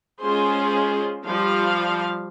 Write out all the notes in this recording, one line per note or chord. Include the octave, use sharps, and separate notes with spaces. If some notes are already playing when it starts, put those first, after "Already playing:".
G#3 C#4 F4 G#4 C5 C6
F3 G3 F5